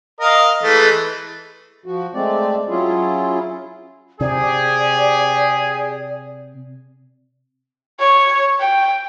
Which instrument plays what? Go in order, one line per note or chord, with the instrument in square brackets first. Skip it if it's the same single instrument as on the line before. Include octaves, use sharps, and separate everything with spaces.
[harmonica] A#4 D#5 F5
E3 G#3 A3
[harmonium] F3 F#4
G#3 A3 C4 D5
F#3 C#4 E4 F4 G#4
[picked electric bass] C3 [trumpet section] G4 G#4 [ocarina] D5
[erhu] C#5
G5